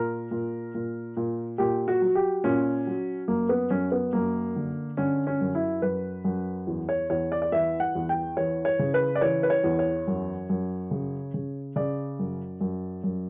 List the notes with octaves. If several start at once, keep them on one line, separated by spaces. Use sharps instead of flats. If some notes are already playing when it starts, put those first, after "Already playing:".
Already playing: A#2 A#4
A#2
A#2
A#2
A#2 G4
F#4
F#3
G4
A#2 C#4
F#3
F#2 A#3
B3
F#2 C#4
B3
F#2 A#3
D3
D3 C#4
C#4
F#2
E4
F#2 B4
F#2
E2
C#5
E2 C#5
D5
D5
E3 E5
F#5
E2
G5
E3 C#5
C#5
C#3
B4
D5
E3 C#5
B4
C#5
E2
C#5
F#2
F#2
C#3
C#3
C#3 D5
F#2
F#2
F#2